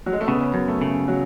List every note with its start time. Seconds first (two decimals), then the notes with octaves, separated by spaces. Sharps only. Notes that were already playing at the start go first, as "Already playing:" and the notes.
0.06 F#3
0.13 G#3
0.21 A3
0.27 C#3 B3
0.40 C#4
0.54 F#2
0.68 A3
0.81 C#3 A3
1.08 F#3